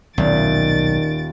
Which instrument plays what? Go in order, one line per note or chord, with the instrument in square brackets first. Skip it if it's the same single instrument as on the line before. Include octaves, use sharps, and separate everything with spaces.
[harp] D#1 [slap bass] B1 [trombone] D#3 [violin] A6 D7